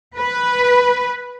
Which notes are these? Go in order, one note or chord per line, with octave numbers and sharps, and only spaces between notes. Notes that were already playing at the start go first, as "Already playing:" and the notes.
B4